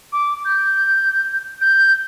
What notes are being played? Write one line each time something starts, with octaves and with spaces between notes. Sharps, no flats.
D6
G6
G6